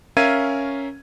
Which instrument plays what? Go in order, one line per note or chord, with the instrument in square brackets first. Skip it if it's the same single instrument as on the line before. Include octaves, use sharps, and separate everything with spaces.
[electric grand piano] C#4 A#4 E5 F5 G#6 D#7